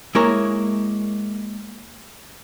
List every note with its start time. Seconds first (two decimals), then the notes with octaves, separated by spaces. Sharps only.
0.15 G#3 A#3 E4 A#4 C#5